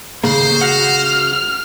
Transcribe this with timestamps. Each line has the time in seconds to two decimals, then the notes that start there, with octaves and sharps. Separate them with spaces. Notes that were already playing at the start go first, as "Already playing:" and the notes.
0.24 D#2 C#3 A#3 C5
0.61 F#4 F#5 F6